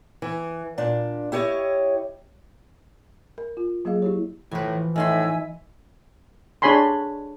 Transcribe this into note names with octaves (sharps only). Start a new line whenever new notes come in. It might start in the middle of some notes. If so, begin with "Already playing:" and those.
E3
A#2 D4
E4 G4 C#5 D#5
A#4
F4
F#3 A#3 G#4 D#5 F5
E4 G4 C#5
A2 E3 F3 B4 G#5
A2 D#3 E4 E5 G#5 C6 E6
D4 G#4 C#5 G#5 B5 C6